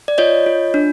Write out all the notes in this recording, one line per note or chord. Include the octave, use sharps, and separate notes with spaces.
D5
F4 C#5 D#5
F4
D4